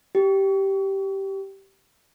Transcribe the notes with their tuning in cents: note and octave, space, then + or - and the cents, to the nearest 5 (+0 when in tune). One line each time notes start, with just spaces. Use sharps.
G4 -10